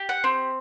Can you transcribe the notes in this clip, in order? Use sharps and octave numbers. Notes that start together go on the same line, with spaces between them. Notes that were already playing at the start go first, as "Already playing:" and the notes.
Already playing: G4
F#5
C4